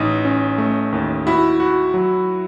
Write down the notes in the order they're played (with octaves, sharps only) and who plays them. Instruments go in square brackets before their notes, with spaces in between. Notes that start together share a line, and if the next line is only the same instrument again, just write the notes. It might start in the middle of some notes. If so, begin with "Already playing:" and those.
Already playing: [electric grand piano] A1 [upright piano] D#4
[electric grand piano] C#4
A3
D#2
[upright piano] E4 [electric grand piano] F#4
[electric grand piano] F#4
F#3